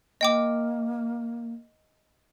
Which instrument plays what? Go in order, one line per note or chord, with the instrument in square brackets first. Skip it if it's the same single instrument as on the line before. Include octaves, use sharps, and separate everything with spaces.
[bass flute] A#3 [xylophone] D#5 G5 D6